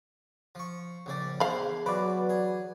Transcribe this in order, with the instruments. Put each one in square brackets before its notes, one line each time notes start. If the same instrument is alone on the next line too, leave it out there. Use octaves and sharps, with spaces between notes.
[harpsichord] F3 C#6
A#1 C#3 D5
[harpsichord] E2 C5 [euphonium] G#4 [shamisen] F5 B5
[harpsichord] E2 F#4 D6 [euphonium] F#3 [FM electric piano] B4 D5
[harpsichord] G#4